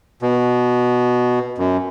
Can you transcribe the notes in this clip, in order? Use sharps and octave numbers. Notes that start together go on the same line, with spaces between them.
B2
F#2